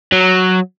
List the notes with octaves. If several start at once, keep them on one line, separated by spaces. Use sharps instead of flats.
F#3